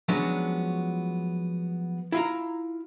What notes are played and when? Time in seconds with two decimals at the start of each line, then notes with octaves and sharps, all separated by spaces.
0.08 F3 F#3 G#3 B3 C#4 D4
2.12 E4 F4 A#5